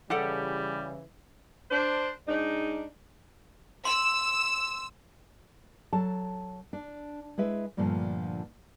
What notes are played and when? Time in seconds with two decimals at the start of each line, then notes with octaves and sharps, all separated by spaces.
0.10 C#3 E3 G3 G4 A4 F#5
1.71 D4 C5
2.28 G#2 D4 D#4
3.85 C6 E6
5.93 F#3 A4 A5
6.73 D4
7.38 G#3 E4 B4 E5
7.77 G2 A#2 D3 F3 A3